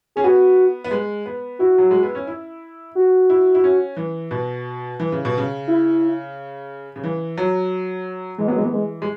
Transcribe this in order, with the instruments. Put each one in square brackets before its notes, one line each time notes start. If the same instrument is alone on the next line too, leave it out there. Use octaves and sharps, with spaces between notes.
[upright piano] C#4 [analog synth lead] G#4
[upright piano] B3 [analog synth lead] F#4
[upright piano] B3
G#3
B3
[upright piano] E4 [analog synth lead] F#4
[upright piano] F#3
G#3
B3
C#4
E4
[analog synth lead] F#4
[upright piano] E4
E4
C#4
E3
B2
E3
C#3
B2
C#3
[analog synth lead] E4
[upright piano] C#3
E3
F#3
[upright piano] E3 [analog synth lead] G#3
[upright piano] F#3 [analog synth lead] B3
[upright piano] E3 [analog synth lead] G#3
[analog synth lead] B3
G#3
[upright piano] G#3